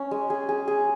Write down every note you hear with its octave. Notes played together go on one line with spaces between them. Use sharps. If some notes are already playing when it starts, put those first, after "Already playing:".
Already playing: C#4
G#3
G#4
G#4
G#4